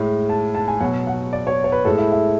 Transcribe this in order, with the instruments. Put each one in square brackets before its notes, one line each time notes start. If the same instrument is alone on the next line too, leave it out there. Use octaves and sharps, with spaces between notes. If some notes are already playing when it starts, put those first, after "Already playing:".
Already playing: [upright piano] A2 G#3
A5
A5
G#5
B2 F#3 F#5
F#5
D5
C#5
C#5
B4
A2 G#3 A4
E4
E4